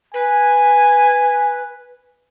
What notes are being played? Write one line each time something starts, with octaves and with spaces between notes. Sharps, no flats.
B4 G#5